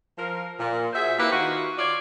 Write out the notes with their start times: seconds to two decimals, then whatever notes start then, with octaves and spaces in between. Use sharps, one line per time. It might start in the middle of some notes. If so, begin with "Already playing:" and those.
0.18 F3 A#4
0.59 A#2
0.93 F#4 G#4 C5 E5
1.17 A#3 C4 E4 G4 B4
1.32 D#3 F4 F#4
1.77 F4 C#5 D5